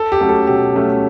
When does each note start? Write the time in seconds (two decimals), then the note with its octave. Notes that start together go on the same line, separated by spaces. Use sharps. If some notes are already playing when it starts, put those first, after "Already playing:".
Already playing: A4
0.12 G4
0.21 F#3 A3 C#4
0.29 A4
0.47 B2 G4
0.75 F#3 A3 C#4